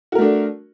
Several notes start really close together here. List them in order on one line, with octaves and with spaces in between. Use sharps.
F#4 A#4 A3 D4